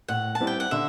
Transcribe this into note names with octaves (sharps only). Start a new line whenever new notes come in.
A2 F#5
A5
G3 C4 E4
G5
F#5
D3 E5